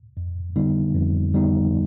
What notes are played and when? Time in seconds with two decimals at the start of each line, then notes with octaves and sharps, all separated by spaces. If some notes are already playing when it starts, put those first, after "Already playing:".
0.17 F2
0.56 D3 G3 B3 D#4
0.95 F2
1.34 D3 G3 B3 D#4